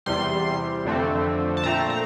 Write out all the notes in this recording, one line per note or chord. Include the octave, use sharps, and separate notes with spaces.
E2 C3 G3 C6
F2 D3 A3 C4
A5
A#2 A3 C4 A#5
A#5